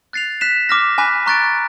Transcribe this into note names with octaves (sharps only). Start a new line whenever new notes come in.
F#6 A6 C7 F7
F#6 B6 E7
D6 F6 A#6
G#5 B5 D6 F#6 B6
A#5 C#6 F#6 A6 D7